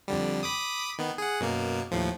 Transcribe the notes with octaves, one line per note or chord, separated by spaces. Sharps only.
F2 D3 G3
B5 D6 D#6
D#3 B3
G#4 F#5
F#2 B2 A#3
D#2 A2 F3